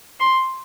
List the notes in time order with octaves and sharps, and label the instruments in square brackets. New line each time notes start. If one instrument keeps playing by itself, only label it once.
[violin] C6